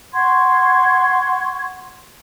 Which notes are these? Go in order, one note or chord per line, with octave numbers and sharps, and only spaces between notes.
F#5 C6 C#6 G#6